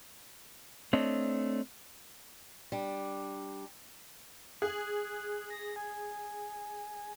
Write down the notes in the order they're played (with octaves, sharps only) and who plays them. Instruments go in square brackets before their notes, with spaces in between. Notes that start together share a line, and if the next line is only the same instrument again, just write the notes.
[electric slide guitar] A3 C4 D4 C#5 D#5
[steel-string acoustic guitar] G3 D4
[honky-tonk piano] G#4 [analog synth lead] F#6
[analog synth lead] A#6
G#5